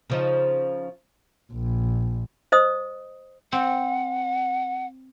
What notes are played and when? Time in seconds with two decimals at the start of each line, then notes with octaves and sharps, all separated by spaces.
0.10 C#3 F3 D#4
1.52 A#1
2.52 C5 D#5 D#6
3.52 C4 F#5